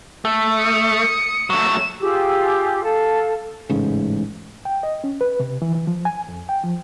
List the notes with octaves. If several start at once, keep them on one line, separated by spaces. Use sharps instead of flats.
A3
D#6 C#7
F#3 A3 E7
F4 G4 G#4 E6
A4 F5
A1 G#2 C#3
G5
D#5
C#4
B4
C3
E3
E3
F3
G#5
F2
G5
F3